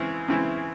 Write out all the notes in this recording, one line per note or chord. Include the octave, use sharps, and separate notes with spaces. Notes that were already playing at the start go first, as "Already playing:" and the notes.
Already playing: C#3 E3 G#3 C4 E4
C#3 E3 G#3 C4 E4